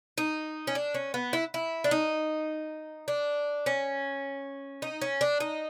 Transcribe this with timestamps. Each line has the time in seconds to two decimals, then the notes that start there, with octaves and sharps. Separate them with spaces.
0.18 D#4
0.67 C#4
0.75 D4
0.94 C#4
1.14 B3
1.33 E4
1.54 E4
1.84 D4
1.91 D#4
3.08 D4
3.66 C#4
4.82 D#4
5.01 C#4
5.21 D4
5.40 D#4